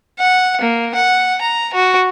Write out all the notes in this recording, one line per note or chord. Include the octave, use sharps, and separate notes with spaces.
F#5
A#3
F#5
A#5
F#4